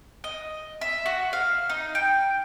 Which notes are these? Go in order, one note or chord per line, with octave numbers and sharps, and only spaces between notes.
D#5
E5
F#4
F5
D#4
G5